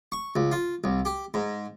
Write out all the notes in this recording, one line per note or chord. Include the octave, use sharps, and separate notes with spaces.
C#6
C#2
F4
C2
G4
G#2